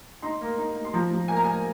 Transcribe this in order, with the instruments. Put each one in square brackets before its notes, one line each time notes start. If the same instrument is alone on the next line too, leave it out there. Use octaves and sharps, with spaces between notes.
[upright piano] D#4 C6
A#3
D#4
D#4
C6
F3 A#5
F3
A#3 G#5
A#5
A#3 G#5